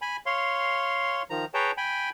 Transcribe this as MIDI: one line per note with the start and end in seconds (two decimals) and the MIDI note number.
0.02 0.17 80
0.02 0.17 83
0.26 1.22 73
0.26 1.22 77
0.26 1.22 84
1.30 1.45 51
1.30 1.45 53
1.30 1.45 82
1.54 1.71 68
1.54 1.71 71
1.54 1.71 73
1.54 1.71 79
1.54 1.71 81
1.54 1.71 82
1.77 2.10 79
1.77 2.10 80
1.77 2.10 83